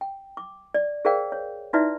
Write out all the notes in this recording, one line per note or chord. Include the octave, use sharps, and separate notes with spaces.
G5
D6
D5
G#4 A#4 C5 D5 F5 G5
C#5
D#4 E4 F#4 B4 D5 E5